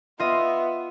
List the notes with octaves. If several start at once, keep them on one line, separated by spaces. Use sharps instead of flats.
B3 F4 D#5 E5